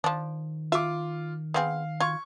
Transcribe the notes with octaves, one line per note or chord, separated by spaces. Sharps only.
D#3 F3 D4
F4 E5 D6
B3 C4 G#4 F5
F4 C#6 G#6